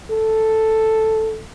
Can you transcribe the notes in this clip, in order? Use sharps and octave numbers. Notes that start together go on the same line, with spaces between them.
A4